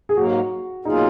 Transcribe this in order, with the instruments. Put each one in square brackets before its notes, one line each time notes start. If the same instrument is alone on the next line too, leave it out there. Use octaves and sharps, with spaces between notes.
[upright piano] G#4
[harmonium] G#2 F#3 A#3 [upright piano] F#4
[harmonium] B2 F#3 A#3 F4 G#4 [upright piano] D#4